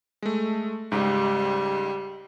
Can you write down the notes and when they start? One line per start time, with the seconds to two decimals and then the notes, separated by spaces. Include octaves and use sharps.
0.22 G#3 A3
0.92 C#2 G#2 G3